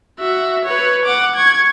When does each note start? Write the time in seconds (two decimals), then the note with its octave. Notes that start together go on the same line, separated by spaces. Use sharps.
0.19 F#4 E5
0.65 B4 C#5
1.05 F#5 D6
1.35 C#6 G#6